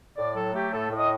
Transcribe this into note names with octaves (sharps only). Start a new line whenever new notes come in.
A2 D5
F#3 A4
A3 G4
A2 A4
A2
D#5